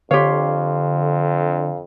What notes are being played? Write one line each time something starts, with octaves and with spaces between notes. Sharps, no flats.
F2 D3 G4 C#5 F5 C6